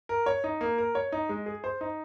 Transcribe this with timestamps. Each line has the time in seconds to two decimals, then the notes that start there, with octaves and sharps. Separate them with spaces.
0.09 A#4
0.26 C#5
0.44 D#4
0.61 A#3
0.78 A#4
0.95 C#5
1.12 D#4
1.29 G#3
1.46 G#4
1.64 C5
1.81 D#4